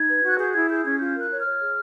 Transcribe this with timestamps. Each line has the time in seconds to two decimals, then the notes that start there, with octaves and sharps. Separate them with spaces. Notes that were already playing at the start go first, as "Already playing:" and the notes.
Already playing: D#4 G#6
0.09 B4
0.24 F#4 F#6
0.38 G#4 G6
0.54 E4 G#6
0.70 G#4 G6
0.84 C#4 G#6
1.00 F4 G6
1.15 A#4 F#6
1.30 C#5
1.40 F6
1.46 C#5
1.60 G#4